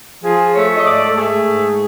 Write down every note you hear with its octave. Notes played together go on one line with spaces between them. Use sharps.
F3 G#4
A3 C#5
D#5
G#2 D5
A4
A3 G#4
G#2